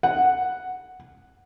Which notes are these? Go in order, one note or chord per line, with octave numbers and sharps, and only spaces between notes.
F#5